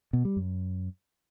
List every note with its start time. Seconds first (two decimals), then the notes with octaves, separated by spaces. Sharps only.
0.13 B2
0.25 G3
0.36 F#2